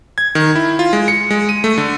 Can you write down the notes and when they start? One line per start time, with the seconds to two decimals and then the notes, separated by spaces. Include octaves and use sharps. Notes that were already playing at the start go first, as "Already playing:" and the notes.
0.18 G#6
0.35 D#3
0.56 E4
0.79 F4
0.93 G#3
1.08 C#7
1.31 G#3
1.49 D#7
1.64 A3
1.78 D3